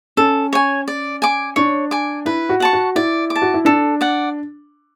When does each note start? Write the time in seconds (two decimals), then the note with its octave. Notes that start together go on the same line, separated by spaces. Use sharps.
0.17 C#4 A4
0.53 C#5 G#5
0.88 D5
1.22 G#5 D6
1.56 D4 C#5
1.91 G#5 D6
2.26 E4 B4
2.49 F#4
2.60 F#5 A5 C#6
2.73 F#4
2.96 E4 D5
3.30 D6
3.36 A5
3.42 F#4
3.54 E4
3.65 D4 A4
4.01 D5 F#5